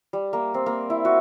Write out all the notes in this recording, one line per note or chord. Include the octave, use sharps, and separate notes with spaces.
G3
A#3
C4
A#3
E4
F#4